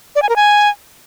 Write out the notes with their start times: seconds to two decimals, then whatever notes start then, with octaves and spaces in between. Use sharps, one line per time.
0.16 D5
0.22 G#5
0.29 A#4
0.36 G#5